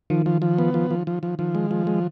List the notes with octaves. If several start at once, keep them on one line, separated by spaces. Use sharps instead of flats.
D#3 F3
F3
F3
B3
F3
F3
F3
F3
D#3 F3
G#3
F3
G#3